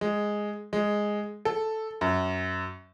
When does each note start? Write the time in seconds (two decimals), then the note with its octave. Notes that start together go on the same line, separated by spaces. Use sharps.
0.01 G#3
0.73 G#3
1.45 A4
2.01 F#2